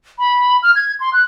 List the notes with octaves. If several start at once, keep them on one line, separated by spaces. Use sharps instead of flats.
B5
F6
G#6
C6
F#6